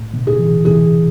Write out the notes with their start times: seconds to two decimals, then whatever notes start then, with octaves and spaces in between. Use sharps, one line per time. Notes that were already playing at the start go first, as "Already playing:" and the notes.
Already playing: A2
0.14 B2 D3
0.27 G#4
0.39 C3 E3
0.65 C3 E3 G#4